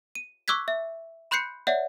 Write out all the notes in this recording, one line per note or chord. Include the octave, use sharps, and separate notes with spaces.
D#7
C#6 D6 E6 F#6 G#6 B6
E5
B5 C6 F#6 G6 C7 C#7
C#5 D5 E5 F#5